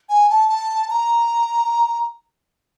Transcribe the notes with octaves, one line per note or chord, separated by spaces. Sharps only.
G#5
A5
A5
A#5